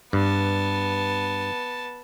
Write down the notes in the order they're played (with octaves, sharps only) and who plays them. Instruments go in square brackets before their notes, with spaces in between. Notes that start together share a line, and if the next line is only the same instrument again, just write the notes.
[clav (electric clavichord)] G2 [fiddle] B3 A5